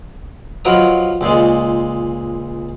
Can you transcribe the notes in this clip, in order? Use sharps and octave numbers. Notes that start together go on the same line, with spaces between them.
F3 F#3 A#4 B4 D#5 D#6
C#2 A#2 G#3